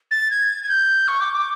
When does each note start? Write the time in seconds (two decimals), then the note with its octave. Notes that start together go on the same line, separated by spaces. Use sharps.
0.11 A6
0.31 G#6
0.63 G#6
0.69 G6
1.08 C#6
1.21 D6
1.33 D6